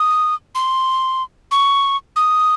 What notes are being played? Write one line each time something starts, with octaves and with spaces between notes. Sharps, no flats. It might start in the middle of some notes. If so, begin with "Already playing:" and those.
Already playing: D#6
C6
C#6
D#6